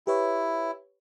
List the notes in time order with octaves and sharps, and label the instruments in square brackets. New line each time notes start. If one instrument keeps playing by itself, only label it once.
[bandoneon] E4 [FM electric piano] G4 B4 C#5